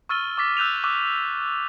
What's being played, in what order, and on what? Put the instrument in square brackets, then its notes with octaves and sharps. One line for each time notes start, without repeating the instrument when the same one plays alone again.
[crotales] C#6 E6 F6 A6 D#7 G7
C#6 D6 A6 B6
E6 F#6 G6 D#7 F7
C#6 D6 E6 F#6